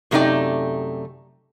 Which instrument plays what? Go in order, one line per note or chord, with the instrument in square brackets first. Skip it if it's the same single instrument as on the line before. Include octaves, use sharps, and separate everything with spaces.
[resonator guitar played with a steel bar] F#2 C3 A3 D#4 D5 G5